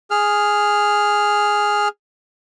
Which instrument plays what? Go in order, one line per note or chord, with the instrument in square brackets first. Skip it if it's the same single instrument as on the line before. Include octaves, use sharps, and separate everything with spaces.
[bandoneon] G#4 F6